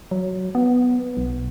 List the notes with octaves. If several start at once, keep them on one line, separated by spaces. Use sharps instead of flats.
F#3
B3
B1